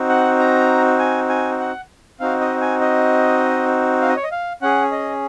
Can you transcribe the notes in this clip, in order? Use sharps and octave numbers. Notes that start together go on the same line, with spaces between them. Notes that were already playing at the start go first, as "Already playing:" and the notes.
Already playing: C4 D#4 F#4
F#5
A#5
G#5
G#5
F#5
C4 D#4 F#4 F5
D#5
G#5
D#5
F5
D#5
C#5
D#5
F5
C#4 G#4 F#5
D#5